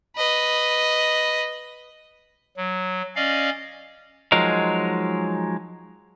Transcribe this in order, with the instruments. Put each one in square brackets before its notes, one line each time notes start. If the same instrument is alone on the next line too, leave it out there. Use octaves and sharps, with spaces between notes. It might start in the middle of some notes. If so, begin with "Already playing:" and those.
[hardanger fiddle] B4 D#5
[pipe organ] F#3
C#4 D5 D#5 F5
[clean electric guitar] F3 F#3 G#3 D#4 A#4